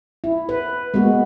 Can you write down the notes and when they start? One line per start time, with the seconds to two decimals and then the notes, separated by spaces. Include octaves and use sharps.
0.24 E4
0.49 B4
0.94 G#3 A#3 B3 F#4